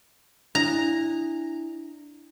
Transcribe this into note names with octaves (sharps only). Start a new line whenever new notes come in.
D4 E4 A#5